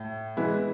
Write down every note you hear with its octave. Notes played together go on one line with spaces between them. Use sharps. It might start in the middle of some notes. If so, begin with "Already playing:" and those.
Already playing: A2
E3 G#3 B3 E4